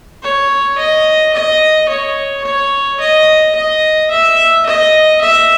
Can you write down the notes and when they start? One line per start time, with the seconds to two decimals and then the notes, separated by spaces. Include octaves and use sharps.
0.23 C#5
0.78 D#5
1.34 D#5
1.89 C#5
2.45 C#5
3.00 D#5
3.55 D#5
4.11 E5
4.66 D#5
5.22 E5